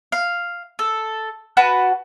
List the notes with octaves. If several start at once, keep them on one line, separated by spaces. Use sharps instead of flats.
F5
A4
F#4 B4 F#5 A5